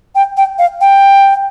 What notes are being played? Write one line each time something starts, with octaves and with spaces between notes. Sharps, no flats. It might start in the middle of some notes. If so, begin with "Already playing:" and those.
G5
G5
F5
G5